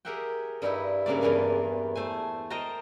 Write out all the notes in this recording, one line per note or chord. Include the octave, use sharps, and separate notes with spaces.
G4 G#4 A#4 E5 F#5 G5
G2 G3 D#4 E4
G2 C#3 A#3 D5
E2 G2 E3 A#3 F5 G#5
A3 C5 G#5
A#4 C5 D#5 G5 A5 A#5